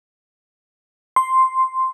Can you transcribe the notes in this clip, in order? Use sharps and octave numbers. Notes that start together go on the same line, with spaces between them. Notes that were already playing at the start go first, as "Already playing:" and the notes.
C6